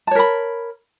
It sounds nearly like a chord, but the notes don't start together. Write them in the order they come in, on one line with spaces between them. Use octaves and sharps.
A5 C#5 A#4 B5